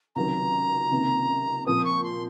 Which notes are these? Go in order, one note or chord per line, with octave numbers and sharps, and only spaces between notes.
C#2 C3 D#3 F#3 A#5
C#2 C3 D#3 A#3
A#2 F3 C4 D#6
C#6
C6